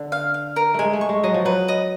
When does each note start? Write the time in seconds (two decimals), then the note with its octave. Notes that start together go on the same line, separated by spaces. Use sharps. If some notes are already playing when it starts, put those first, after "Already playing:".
Already playing: D3
0.12 F5
0.34 F5
0.56 A#4
0.74 G#3 A3 G#5
0.93 A3
1.01 C#6
1.09 G#3
1.23 F#3 D#5
1.34 F3
1.45 F#3 B4
1.68 D#5